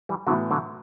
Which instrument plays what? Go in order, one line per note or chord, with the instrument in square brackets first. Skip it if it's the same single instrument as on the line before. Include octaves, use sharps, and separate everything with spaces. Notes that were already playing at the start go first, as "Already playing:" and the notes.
[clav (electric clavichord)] E3 G3
[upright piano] A2 E3 B3 F#4 [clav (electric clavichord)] D3 F#3
[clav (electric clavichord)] D3 F#3